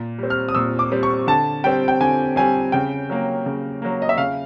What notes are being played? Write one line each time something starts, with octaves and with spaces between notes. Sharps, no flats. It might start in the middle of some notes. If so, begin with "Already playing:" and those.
Already playing: A#2
G3 C4
F6
D#6
A#2 E6
D6
G3 C4
C#6
D3 A5
G3 C4 G5
G5
D3 G#5
G3 C4 G#5
C#3 G5
F#3 A#3
C#3
F#3 A#3
D#5
E5
C#3 F5